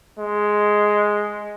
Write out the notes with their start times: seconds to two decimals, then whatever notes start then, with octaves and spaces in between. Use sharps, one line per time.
0.18 G#3